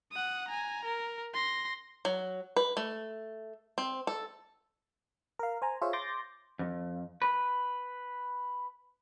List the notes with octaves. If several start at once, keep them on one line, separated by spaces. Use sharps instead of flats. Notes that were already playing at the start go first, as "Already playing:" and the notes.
F#5 D#6
G#5 A#5
A#4
C6 A#6
F#3
B4
A3
C4
A4
A#4 F5
C5 G#5 A#5
F4 G#4 C5 C#5 E5 F5
C6 D6 G6 A6 A#6
F2
B4